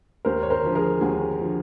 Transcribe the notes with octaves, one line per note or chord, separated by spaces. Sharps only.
D#2 A#4 C5
C#5
A#4 C5
D3 F3
G#4 A#4
D#2 F#4 G#4
D3 F3